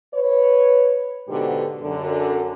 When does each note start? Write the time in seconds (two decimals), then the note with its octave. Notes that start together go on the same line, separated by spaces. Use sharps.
0.14 B4 C#5
1.29 G#2 B2 D3 G4
1.82 F#2 D3